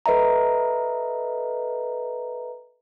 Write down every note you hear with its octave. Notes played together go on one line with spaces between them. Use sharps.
A4 B4 D#5 E5 A#5